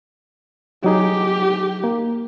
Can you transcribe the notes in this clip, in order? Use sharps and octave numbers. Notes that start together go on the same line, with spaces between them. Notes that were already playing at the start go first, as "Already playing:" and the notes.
F#3 D#4 G4 G#4
A#3